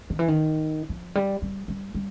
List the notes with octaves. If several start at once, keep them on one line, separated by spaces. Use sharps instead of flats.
D#3
E3
D#3
F3
G3
G3
G3
G3